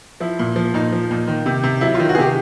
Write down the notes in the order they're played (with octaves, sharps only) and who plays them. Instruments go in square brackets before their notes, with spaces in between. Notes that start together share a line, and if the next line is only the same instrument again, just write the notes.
[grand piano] F3 E4
A#2
F3
A#2 D#4
F3
A#2
D#3
C3
C3
F#3 E4
D#3 F4
F#4
G#4
C3 G4